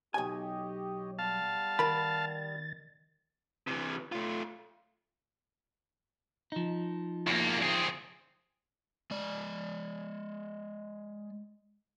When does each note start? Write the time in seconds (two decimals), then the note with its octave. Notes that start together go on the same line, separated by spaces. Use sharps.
0.14 B1 G4 C#5 D#5 G#5
1.19 G3 B3 F5 A5
1.79 D#3 A#4 B5 A6
3.67 C3 E3
4.12 A3 F4
6.52 F3 D#4
7.27 E2 A#3
7.63 C4 G#4
9.11 G#3 D5